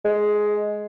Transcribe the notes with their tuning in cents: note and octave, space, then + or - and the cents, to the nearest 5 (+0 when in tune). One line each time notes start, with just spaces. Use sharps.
G#3 +10